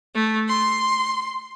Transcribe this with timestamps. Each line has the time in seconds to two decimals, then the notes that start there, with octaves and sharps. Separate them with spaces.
0.15 A3
0.49 C6